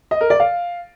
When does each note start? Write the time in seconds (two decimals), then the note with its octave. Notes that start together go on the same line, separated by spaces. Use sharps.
0.11 D#5
0.21 A#4
0.30 D5
0.40 F5